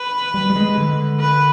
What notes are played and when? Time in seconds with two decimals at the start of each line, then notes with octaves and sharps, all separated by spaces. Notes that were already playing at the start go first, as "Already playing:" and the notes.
Already playing: B4
0.34 G3
0.50 G3
0.56 G#3
0.77 D3
1.20 B4